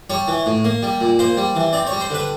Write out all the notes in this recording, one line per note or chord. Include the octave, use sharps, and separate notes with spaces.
G3 C#5
E3
A2
A#3
G3
A#2
A#3 C5
G3
E3
C4 D5
C#5
G3
C5
D3 B4